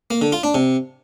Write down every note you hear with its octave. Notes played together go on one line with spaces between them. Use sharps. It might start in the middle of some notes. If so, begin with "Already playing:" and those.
A#3
D3
F4
D4
C3